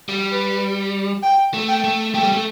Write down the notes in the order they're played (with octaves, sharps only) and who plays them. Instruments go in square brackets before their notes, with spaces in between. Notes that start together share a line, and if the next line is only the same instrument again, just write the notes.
[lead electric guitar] G3
[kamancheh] B4
G5
[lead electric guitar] A3
[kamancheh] G5
[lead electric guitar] A3
[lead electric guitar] A3 [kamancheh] G5
[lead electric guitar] G3
A3